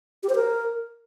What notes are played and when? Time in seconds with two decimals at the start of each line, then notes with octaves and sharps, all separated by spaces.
0.23 G4
0.29 C5
0.35 A#4